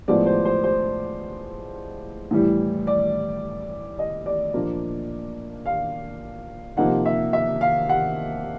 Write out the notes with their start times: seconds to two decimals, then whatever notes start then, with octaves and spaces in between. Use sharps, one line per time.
0.08 A2 F3 G#3 B3 D5
0.26 C5
0.45 C5
0.64 C5
2.31 A2 E3 G3
2.87 D5
3.99 D#5
4.26 D5
4.54 A#2 F3 A#3 D4
5.66 F5
6.77 C3 F3 A#3 D#4 F#5
7.06 E5
7.33 E5
7.61 F5
7.89 F#5